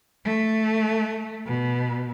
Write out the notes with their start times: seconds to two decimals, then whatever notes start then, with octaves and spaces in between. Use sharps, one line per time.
0.25 A3
1.46 B2